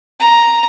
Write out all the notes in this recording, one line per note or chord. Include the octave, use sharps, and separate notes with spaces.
A#5